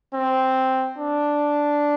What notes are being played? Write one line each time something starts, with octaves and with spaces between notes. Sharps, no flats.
C4
D4